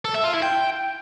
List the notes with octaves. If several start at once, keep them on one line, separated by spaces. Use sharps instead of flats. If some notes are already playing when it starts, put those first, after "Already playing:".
A4
E5
F4
E4
G5